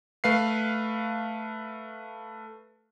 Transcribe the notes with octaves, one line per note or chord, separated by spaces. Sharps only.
A3 B4 F5 C7